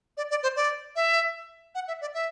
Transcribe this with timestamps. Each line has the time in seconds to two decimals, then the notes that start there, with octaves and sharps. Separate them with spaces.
0.17 D5
0.30 D5
0.43 C5
0.56 D5
0.96 E5
1.75 F#5
1.88 E5
2.01 D5
2.14 E5